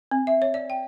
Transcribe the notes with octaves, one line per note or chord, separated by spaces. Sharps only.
C4
E5
C#5
D5
G5